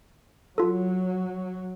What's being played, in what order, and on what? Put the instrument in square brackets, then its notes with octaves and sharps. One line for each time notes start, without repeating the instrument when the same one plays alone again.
[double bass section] F#3 [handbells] F4 A4